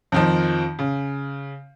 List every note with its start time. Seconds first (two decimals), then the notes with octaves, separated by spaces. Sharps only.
0.12 F2 D#3 F3
0.79 C#3